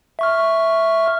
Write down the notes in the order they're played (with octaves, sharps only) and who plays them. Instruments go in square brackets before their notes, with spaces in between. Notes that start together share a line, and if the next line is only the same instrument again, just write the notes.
[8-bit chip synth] E5 C#6 F6